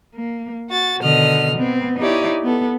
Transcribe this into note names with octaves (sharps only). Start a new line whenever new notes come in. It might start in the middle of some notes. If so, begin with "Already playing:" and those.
A#3
F#4 A6
B2 D3 D#3 D#5 F6
B3 C4
D#4 E4 G4 C#5 D5
B3 A4